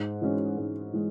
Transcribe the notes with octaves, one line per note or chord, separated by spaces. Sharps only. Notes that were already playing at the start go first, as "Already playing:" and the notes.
Already playing: G#2
E3 G#3 C#4
G#2
E3 G#3